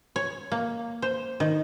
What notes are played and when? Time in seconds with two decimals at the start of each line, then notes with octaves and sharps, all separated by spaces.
0.16 C#5
0.52 A#3
1.02 C5
1.40 D#3